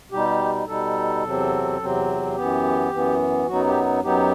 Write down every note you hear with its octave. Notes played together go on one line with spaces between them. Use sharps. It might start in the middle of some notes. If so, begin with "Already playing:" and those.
B2 G3 D#4 G4
B2 G3 D#4 A4
E2 C3 F#3 C4
E2 C3 F#3 C4
F#2 E3 B3 G4
F#2 E3 B3
F#2 F#3 B3 D#4 F#4
G4
F#2 F#3 B3 D#4 G4